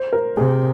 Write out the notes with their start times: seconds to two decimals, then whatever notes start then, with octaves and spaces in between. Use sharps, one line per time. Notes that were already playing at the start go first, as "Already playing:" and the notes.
Already playing: C5
0.13 A#4
0.37 C3 G#4